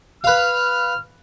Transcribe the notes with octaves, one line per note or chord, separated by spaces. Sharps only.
B4 F5 F6